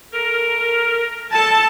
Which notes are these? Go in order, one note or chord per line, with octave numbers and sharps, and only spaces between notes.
A3 A#4
A4 A5